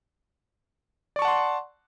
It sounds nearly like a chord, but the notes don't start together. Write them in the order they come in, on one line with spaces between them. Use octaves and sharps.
D5 C#6 A5 F#5 C6